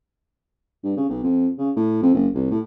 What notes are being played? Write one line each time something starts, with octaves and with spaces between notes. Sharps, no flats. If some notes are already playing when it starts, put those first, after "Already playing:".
G2
C#3
B1
F2
C#3
A2
F2
F#1
C2
A2